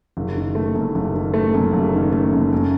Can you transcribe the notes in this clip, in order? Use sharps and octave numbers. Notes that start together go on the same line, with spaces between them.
F#1
D#3
A3
F#2
F#1
D#3
A3
F#2
F#1
D#3
A3
F#2
F#2